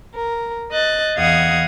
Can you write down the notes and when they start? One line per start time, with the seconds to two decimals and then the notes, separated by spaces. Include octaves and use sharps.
0.15 A#4
0.71 D#5 F#6 A6
1.18 E2 D#5 F5 F#5 D#6 G#6